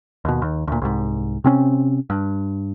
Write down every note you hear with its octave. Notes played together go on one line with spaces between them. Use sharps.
D#2 B2
D#2
D2 A#2
C2 G#2
C3 C4 C#4
G2